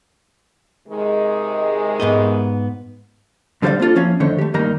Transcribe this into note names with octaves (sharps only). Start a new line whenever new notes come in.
C3 D#3 G#3
G#2 B3 D#5
G2 D3 G3 C5 D5 F5
A#3 C4 D4 F4 A4
F3 A#3 C#4 E4 C#5 F5
F2 D3 D#3 A3 C5 C#5
A3 G4
G2 D#3 A#3 D#4 A#5